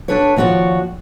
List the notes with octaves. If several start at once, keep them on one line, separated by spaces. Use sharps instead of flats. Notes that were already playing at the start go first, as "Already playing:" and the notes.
D4 F#4 A4 B4 C#5
D#2 F3 F#4 C#5 D5